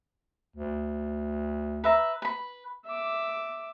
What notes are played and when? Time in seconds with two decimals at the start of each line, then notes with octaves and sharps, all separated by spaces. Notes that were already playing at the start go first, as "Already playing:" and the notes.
0.56 D2
1.84 B4 E5 A#5
2.22 B4 B5
2.86 E5 D6